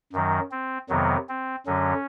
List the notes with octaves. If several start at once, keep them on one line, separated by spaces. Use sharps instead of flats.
F#2 D#3 F#3
C4
F2 C3 D#3 F#3 B3
C4
F#2 D3 F#3 C#4